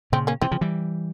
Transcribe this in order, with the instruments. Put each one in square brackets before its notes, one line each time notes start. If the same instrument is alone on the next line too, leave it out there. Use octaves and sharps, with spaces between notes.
[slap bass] A#2 C#3 [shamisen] C4
[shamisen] A#3 C#4
[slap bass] C3 E3 [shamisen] C4
[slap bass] C#3 F3
E3 G3